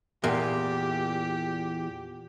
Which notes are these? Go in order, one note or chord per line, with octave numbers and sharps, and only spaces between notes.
E2 A#2 G4